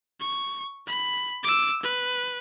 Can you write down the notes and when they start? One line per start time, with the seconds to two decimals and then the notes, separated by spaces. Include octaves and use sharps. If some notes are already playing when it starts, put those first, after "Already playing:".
0.20 C#6
0.87 B5
1.44 D6 E6
1.83 B4